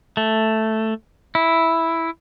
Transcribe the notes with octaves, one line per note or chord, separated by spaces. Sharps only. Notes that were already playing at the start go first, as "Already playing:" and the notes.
A3
E4